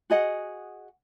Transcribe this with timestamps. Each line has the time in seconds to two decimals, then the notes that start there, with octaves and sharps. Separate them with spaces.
0.10 F#4 G#4 D#5 F#5